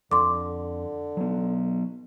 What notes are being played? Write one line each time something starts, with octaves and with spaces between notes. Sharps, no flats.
F2 D3 C6 D6
F#3 B3